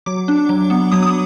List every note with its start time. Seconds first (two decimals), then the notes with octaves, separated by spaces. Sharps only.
0.06 F#3 D6
0.28 D4
0.49 F#3
0.70 B3
0.92 F#3 D#6
1.03 D#6